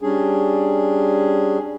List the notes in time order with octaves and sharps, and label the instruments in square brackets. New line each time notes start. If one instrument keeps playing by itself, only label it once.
[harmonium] G3 C#4 D4 G#4